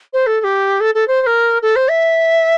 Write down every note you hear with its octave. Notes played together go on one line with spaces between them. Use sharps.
C5
A4
A4
G4
A4
A4
C5
C5
A#4
A4
C5
E5